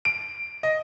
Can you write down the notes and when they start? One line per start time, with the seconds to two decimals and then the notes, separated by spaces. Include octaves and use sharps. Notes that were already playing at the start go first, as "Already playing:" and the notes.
0.05 D7
0.63 D#5